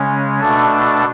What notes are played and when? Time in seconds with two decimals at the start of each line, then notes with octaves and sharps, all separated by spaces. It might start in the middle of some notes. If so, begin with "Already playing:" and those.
Already playing: C#3 G#3 C#4
0.40 B2 A3 D4 A4